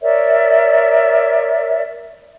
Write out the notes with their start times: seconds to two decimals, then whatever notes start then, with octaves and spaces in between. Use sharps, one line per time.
0.01 A#4 C#5 D5 E5